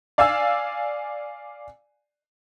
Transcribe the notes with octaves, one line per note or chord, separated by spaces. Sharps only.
D5 F5 G#5 E6